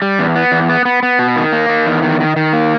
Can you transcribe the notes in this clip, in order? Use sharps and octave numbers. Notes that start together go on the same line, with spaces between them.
G3
E2
B3
E2
B3
B3
B3
B2
D#3
A#3
D#3
E2
D#3
D#3
D#3
A#3